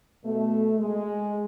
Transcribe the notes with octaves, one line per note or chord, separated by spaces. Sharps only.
B2 A3
G#3